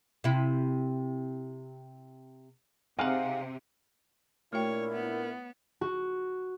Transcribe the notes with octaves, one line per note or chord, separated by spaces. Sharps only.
C3 E4
C3 D#4 G#4 F5 F#5
A#2 A3 D4 E4 F#4 A#4 C#5 G5
B3
F#4